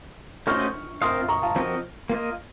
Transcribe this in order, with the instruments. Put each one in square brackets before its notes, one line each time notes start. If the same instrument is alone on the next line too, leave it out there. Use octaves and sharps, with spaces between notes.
[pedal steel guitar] A3 C#4 F#4 C5 D#5 [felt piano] C#6 F6
[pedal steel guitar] C4 F4 A#4 F5 [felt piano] C6 D#6
[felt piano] A#5 C#6
F5 A5
[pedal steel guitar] F3 C4 F#4 A#4 D#5
A#3 F4 A#4 D#5